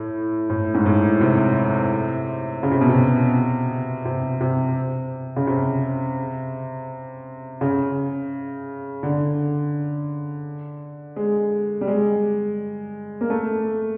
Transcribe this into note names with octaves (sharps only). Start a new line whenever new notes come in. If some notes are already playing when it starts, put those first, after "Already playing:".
Already playing: A2
A2
G#2
A2
C3
C#3
C3
B2
C3
C3
C3
C#3
C3
C#3
D3
G#3
G3
G#3
A#3
A3